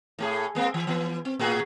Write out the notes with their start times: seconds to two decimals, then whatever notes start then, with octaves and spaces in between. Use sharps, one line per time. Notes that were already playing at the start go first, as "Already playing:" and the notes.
0.19 A2 A3 G#4
0.55 G#3 A#3 C4
0.74 E3
0.87 E3 B3
1.25 C4
1.39 A2 F#4 G#4